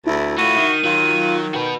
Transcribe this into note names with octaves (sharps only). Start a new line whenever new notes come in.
D2 E4
A3 F4 F#4 D#7
D#3
D#3 F#3 F4
F#4 B4 G5